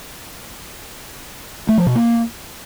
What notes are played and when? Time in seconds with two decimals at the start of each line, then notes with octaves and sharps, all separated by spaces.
1.69 A3
1.78 F3
1.86 B2
1.95 A#3